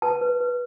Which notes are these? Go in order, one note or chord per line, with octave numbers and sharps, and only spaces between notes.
B4 A5
B4
B4